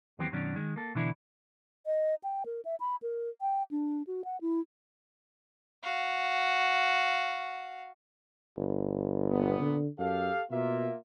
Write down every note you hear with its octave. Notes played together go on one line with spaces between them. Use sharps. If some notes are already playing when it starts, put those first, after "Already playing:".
D#2 E3 F#3 B3 C4 G4
F#2 B2 D#3 F#3 C#4 D4
D#3 G#3
A#3 A4
B2 D3 E3 D4 E4
D#5
G5
A#4
E5
B5
A#4
G5
D4
F#4
F#5
E4
F#4 F5
G1
A#2 B3
D3
F#2 G4 A4 F5
B2 A#3 F4 E5